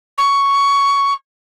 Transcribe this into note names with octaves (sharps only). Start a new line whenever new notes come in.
C#6